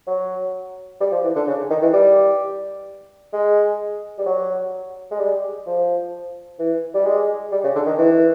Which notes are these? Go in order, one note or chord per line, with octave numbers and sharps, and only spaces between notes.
F#3
G3
F3
E3
D3
C#3
D#3
E3
G3
G#3
G3
F#3
G#3
G3
F3
E3
G3
G#3
G3
C#3
D3
D#3
E3